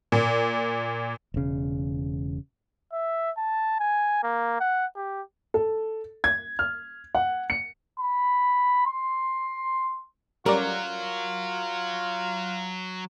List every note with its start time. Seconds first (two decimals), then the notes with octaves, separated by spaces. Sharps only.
0.12 A#2
1.34 E1 C#3
2.93 E5
3.38 A5
3.80 G#5
4.23 A#3
4.60 F#5
4.96 G4
5.54 A4
6.24 G#6
6.59 F6
7.15 F#5
7.50 C#7
8.00 B5
8.86 C6
10.46 F#3 G3 C#4 F4 A#4 D5